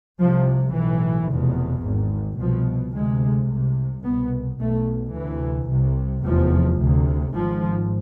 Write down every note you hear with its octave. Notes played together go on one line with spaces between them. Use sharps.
C2 C3 F3
B1 A2 E3
F1 E2 B2
G#1 G#2
C2 B2 F3
D2 C3 G#3
C2 C3
C2 B2 B3
B1 B2 A3
D2 C3 E3
C2 C3
F1 E2 C3 F3
D2 C3
G#1 G#2 F3